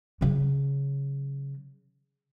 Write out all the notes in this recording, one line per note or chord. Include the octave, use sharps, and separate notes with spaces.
C#3 F#3